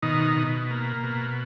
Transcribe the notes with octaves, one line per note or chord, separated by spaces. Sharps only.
B2 D#3 D#4
B2
A#3
B2